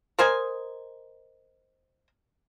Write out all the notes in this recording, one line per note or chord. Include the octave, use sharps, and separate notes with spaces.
A#4 C5 D#5 G#5